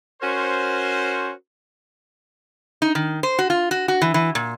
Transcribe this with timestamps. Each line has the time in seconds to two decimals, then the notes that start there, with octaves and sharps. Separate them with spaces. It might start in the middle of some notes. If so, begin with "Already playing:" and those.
0.22 C#4 F#4 A#4 C5
2.82 D#4
2.95 D#3
3.23 C5
3.39 F#4
3.50 F4
3.71 F#4
3.88 F#4
4.02 E3
4.14 E3
4.35 A#2